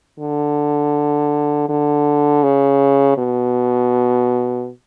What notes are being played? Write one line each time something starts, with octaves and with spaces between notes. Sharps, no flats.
D3
D3
C#3
B2